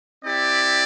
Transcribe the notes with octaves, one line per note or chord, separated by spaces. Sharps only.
C4 E4 G4 D5